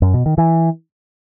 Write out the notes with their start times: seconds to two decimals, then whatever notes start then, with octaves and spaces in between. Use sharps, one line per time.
0.02 F#2
0.14 B2
0.26 D#3
0.38 E3